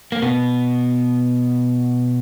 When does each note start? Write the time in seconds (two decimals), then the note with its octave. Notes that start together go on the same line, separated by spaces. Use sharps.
0.12 A#3
0.22 B2 B3